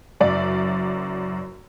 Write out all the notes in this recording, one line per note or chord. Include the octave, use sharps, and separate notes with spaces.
F#1 F#2 D5 E5